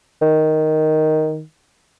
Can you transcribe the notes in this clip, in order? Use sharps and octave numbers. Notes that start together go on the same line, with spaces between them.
D#3